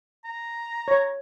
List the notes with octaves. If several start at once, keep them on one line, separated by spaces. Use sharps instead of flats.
A#5
C#5